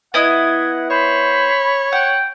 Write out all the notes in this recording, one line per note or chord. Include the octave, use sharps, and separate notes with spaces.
B3 E4 D#5 F#5 G#6
C5 C#5 B5
F#5 G5